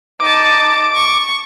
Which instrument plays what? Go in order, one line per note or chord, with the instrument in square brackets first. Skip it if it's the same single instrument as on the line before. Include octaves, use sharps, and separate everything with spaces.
[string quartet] D#4 A5 [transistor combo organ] D6
[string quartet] C#6